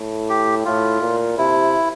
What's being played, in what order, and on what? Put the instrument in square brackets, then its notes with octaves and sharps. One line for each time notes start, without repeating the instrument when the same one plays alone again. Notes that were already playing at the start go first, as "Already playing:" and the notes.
Already playing: [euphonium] A2
[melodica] G4
[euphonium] A2 [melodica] F4
[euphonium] A#2
[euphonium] C3 [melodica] E4